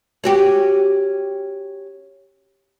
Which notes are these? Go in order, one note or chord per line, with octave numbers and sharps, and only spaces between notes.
C#4 F#4 G4